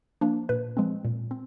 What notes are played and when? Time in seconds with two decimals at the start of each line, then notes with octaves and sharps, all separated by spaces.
0.21 F3 A#3 D4
0.49 A#2 B4
0.77 F3 G#3 C4
1.05 A#2
1.31 C4